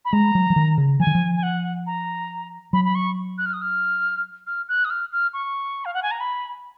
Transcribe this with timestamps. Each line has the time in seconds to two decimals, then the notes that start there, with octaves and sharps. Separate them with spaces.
0.05 B5
0.13 G#3 A#5
0.35 F#3
0.50 F3
0.56 D#3
0.78 C#3
1.00 F3 G#5
1.07 D#3
1.15 F3
1.36 G#5
1.43 F#5
1.86 A#5
2.73 F#3 B5
2.85 B5
2.95 C#6
3.38 F#6
3.46 F6
3.53 D#6
3.62 F6
4.47 F6
4.68 F#6
4.85 D#6
4.90 F6
5.12 F6
5.33 C#6
5.85 F5
5.94 F#5
6.03 G#5
6.11 A#5
6.20 B5